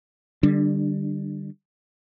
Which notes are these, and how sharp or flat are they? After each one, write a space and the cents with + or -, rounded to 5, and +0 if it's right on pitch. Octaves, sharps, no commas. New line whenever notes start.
D3 +25 G3 +0 D4 +0